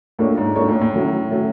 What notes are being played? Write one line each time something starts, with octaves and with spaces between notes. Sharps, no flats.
A2 A#3 D4 F4 A4 C#5
G#2
G#2 A#3 D4 F4 A4 C#5
A2
A2
F#3 A3 C#4
F#3 A3 C#4